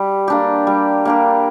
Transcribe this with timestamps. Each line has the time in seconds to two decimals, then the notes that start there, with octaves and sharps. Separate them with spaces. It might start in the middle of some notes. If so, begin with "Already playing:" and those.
Already playing: G3
0.28 A#3 D4 G4
0.67 G3
1.05 A#3 D4 G4